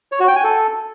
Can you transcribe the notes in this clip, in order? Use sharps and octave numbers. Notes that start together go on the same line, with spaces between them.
C#5
F#4
G5
G#5
A4